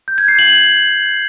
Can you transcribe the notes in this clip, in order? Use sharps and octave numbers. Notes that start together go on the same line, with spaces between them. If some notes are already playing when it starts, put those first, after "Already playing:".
G6
G#6
C7
F#7